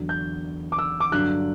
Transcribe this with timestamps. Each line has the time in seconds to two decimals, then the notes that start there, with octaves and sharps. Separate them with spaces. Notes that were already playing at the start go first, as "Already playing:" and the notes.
Already playing: E2 D3 F#3
0.09 G6
0.72 D6
0.79 E6
1.00 D6
1.12 G2 D3 F#3 F#6